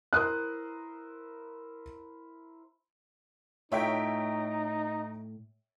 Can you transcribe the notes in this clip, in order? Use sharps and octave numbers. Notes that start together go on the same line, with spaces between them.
E4 A#4 C5 D#6 F#6
A2 A3 D#4 F4 C#5 E5 G5